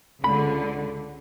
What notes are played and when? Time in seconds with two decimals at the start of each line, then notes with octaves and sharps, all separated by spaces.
0.24 C#2 D3 B5